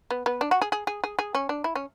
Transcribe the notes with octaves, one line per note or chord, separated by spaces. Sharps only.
B3
B3
D4
F#4
G#4
G#4
G#4
G#4
G#4
C#4
D4
E4
C#4